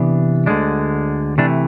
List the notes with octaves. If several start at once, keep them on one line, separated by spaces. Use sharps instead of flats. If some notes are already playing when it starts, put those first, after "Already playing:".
Already playing: C3 E3 B3 D4
D2 D3 G#3 D4
C3 E3 A3 D4